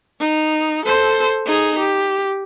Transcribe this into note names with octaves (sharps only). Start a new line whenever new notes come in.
D#4
A4 C5
D#4 G#4
G4